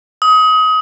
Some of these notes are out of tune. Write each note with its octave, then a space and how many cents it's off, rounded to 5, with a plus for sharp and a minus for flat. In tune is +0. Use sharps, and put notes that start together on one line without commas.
D#6 +25